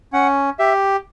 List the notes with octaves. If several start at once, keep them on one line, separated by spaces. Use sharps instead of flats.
C#4 F#5
G4 E5